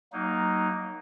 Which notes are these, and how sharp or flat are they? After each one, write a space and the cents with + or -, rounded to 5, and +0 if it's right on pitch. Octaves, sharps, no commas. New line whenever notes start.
F#3 +25 A#3 +0 D#4 +0